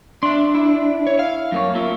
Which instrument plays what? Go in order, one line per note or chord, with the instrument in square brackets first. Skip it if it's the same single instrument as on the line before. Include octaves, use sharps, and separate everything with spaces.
[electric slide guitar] D4 [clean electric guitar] E5 C6
[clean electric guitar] E4
[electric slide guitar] C#5
F5
[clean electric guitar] F#2 A#3 C#5
A#3 F4 E5